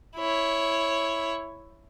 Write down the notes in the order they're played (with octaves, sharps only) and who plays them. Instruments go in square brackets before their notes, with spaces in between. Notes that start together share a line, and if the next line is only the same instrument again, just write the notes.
[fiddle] E4 C#5